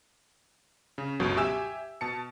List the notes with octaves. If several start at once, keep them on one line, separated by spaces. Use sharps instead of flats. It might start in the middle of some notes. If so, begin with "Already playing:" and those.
C#3
G1 C#2 B2 F#3
G4 E5 G#5 E6 E7
B2 A5 C#7